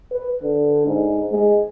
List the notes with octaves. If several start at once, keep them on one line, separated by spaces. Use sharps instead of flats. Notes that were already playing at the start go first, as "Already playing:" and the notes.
B4
D3
G#2
G#3